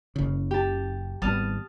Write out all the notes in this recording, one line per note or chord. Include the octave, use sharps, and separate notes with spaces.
F#1 C#3
G4 A5
G#1 G3 B3 A5 D#6 F6